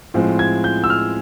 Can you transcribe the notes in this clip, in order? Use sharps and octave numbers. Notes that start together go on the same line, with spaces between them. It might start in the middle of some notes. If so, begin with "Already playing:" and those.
A2 F3 G#3 C4
G#6
G6
E6
F6